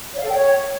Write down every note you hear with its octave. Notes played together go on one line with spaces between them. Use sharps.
C#5
F5
A4
G5
C#5